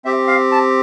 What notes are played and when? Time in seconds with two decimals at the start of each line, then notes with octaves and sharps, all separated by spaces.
0.05 C4 G4 E5
0.28 F5
0.52 A5